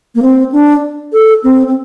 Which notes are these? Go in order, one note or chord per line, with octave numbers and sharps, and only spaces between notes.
A#3
C4
D4
A4
C4
C4